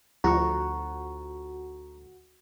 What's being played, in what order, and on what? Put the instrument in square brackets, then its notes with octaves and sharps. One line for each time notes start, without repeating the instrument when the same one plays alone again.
[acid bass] D2 [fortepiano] F3 [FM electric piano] F#4 [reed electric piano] A#5 C#6